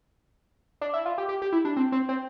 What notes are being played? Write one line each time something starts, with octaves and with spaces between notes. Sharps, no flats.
D4
E4
F4
G4
G4
G4
E4
D4
C4
C4
C4